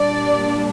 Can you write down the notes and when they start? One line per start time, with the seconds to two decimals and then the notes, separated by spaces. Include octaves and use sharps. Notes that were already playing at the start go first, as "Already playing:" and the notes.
Already playing: A#2 G3 D4 D5